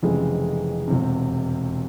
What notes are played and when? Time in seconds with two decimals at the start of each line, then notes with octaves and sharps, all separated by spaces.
0.02 F1 F2 C#3 E3 G#3
0.88 E1 E2 C3